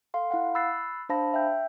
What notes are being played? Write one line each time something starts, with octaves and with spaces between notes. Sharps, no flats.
A4 F5 C6
E4 F5 F#5
B5 E6 F#6 A6 C7
D4 C5 F5 A5 B5 A#6
E5 G5 G6